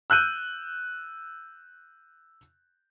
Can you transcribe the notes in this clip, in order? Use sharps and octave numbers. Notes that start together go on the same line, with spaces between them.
E6 F#6 G6 D#7